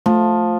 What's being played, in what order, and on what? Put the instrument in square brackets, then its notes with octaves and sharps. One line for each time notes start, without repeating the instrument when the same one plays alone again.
[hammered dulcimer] F3 [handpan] A3